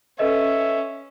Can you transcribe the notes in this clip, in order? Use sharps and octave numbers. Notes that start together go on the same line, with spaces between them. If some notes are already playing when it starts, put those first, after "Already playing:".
C#4 A4 B4 D#5 E5